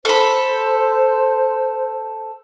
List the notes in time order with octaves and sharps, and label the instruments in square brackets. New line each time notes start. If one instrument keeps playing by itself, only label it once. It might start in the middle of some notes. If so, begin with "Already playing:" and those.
[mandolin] A4 B5 [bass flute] C5